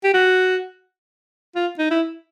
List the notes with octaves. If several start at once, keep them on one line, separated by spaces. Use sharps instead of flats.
G4
F#4
F4
D#4
E4